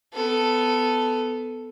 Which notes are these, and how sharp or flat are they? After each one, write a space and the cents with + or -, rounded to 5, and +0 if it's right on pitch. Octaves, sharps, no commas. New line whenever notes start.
B3 +20 A4 +0